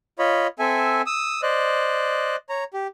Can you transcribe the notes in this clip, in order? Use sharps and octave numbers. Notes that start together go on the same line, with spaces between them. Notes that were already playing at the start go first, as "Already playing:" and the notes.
F4 C#5 D#5 B5
C4 A4 E5 G#5
D#6 E6
C5 D5 D#5 F#6
C#5 A#5
G4